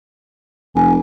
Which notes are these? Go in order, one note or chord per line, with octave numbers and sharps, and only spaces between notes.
F1 G#5